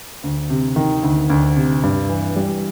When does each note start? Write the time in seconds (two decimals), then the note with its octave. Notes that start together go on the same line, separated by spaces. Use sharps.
0.24 D2
0.50 C3
0.76 D#3
1.03 D2
1.30 D2
1.56 C3
1.83 G2
2.09 E3
2.36 G3